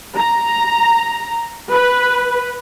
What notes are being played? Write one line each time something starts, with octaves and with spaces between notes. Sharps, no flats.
A#5
B4